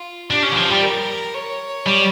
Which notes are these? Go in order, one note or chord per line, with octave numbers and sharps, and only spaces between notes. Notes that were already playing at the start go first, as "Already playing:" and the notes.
Already playing: F4
D4 G4
C#4
E3
F3
G3
A#4
C#5
G3